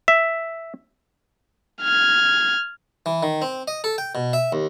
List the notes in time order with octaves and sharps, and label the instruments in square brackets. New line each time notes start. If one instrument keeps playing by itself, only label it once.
[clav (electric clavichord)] E5
[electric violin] F6 G#6
[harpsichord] E3
D#3
C4
D#5
A4
G5
B2
E5
D#2